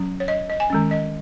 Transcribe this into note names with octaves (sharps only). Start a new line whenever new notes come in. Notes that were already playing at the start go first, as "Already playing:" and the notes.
Already playing: F#3 C#4
C#5
D#5
D#5
G#5
D#3 G#3 C#4
D#5